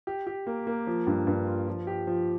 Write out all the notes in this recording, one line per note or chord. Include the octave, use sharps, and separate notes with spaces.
G4
G4
A#3
A#3
F3
G2
G2
F4
F3
G4
F3